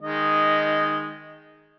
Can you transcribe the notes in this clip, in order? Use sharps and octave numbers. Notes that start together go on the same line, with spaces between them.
D#3 G#3 D#5